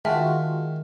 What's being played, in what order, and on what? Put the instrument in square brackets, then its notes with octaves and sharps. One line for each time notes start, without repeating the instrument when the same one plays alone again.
[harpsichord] D#3 [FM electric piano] G#3 F4 F#4 [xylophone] E5 G5 A5